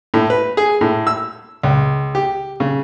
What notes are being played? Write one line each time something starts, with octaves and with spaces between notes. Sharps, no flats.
A2
B4
G#4
A2
E6
C#2
G4
C#3